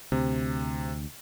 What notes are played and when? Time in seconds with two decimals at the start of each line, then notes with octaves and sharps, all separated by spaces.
0.12 D2 C3